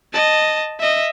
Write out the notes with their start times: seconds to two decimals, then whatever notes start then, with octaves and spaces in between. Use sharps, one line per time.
0.13 D#5 A5
0.80 D#5 E5